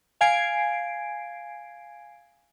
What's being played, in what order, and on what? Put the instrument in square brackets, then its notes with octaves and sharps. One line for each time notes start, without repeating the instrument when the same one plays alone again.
[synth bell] F5 G#5 G#6 C7 D7